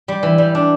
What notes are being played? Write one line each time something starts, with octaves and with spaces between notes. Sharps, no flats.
G3
E3
G3
D4